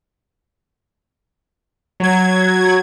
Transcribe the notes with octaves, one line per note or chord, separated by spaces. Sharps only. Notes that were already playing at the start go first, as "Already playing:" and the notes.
F#3 G#6